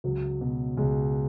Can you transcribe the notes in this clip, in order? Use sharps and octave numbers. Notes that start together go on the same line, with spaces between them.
C#2 F#3
B2
C#2 G#3